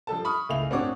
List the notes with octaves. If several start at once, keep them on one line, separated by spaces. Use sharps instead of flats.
F3 G3 A4 A5
B5 C#6 D#6 F6
C#2 A3 E4 F5 G#5 F7
A2 C4 D4 F#4 C#5 D6